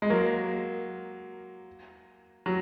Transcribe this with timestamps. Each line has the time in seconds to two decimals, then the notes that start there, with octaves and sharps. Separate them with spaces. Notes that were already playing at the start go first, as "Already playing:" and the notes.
0.02 G#3
0.10 F#3 A#3
2.46 F#3